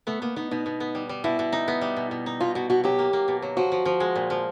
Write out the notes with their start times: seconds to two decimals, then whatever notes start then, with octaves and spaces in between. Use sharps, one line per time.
0.07 A3 B3
0.22 A#3 B3
0.36 B3 D#4
0.51 B2 D#4
0.66 B2
0.80 B3
0.95 G3
1.09 G3
1.24 B2 E4
1.39 B2
1.52 D#4
1.68 B3
1.81 G3
1.96 B2
2.11 B2
2.26 D#4
2.40 B2 F4
2.55 B2 F#4
2.70 B2 F#4
2.84 F#3 G4
2.99 A#3
3.13 A#3
3.28 B2
3.42 F#3
3.57 F3 F#4
3.72 F3
3.85 F3
4.00 G#3
4.16 A#2
4.30 F3